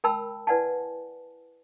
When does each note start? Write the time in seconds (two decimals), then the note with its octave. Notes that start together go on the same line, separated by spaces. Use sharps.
0.04 A#4 G5 A5 B5 E6
0.47 E4 B4 D5 F#5 G#5 A5